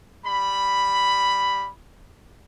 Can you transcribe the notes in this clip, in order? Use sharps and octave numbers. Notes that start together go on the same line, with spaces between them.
G3 B5